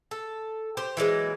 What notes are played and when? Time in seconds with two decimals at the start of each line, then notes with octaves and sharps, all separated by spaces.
0.11 A4
0.77 G4 C5
0.97 E3 F#3 G#3 A#3